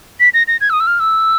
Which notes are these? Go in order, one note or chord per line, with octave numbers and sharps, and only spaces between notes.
B6
A#6
A#6
G#6
E6
D#6
E6
F6
E6